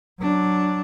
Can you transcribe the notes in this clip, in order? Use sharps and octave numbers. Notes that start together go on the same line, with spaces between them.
F#3 D4